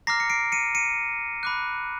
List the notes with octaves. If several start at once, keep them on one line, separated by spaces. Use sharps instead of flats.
A#5 D6 F6 A#6 C7
C#7
C7 D7
C#7 D#7
C#7 D#7
B5 D6 F#6